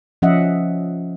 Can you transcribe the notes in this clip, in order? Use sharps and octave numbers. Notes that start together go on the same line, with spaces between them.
F3 C#4 D#5 E5 F#5